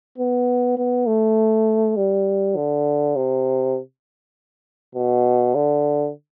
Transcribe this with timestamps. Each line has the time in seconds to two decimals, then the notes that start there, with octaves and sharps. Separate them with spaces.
0.18 B3
0.77 B3
1.07 A3
1.97 G3
2.56 D3
3.16 C3
4.95 B2
5.55 D3